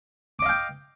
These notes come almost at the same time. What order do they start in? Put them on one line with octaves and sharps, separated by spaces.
D6 D#5 F5 G5